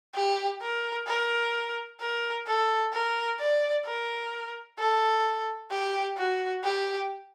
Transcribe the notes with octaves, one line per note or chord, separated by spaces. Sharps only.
G4
A#4
A#4
A#4
A4
A#4
D5
A#4
A4
G4
F#4
G4